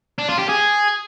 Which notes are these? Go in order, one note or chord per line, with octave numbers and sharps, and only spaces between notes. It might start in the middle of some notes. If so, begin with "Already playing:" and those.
D4
F4
G4
G#4